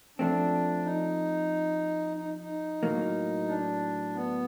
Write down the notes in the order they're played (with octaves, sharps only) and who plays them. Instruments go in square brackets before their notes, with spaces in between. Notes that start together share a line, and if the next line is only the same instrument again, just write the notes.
[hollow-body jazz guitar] F3 A3 C4 [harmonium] D4
[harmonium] D#4
D#4
D#4
[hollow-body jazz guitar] A2 F#3 A#3
[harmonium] D4
B3